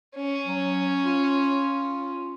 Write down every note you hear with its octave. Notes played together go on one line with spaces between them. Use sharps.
C#4
F#3
F4